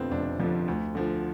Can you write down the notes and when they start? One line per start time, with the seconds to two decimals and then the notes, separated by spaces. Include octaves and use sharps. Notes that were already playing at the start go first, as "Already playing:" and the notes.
Already playing: F1 F2 D3 F3 B3 C4
0.11 F1 D4
0.39 F2 D3 F3
0.68 D2
0.95 D3 F3